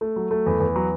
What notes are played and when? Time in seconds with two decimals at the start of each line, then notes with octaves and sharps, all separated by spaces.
0.01 A3
0.16 F#3
0.31 A3
0.46 E2
0.60 E2
0.76 F#3